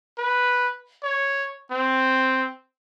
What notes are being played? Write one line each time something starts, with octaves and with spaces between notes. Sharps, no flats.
B4
C#5
C4